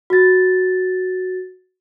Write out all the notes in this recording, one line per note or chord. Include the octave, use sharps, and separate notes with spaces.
F#4 A6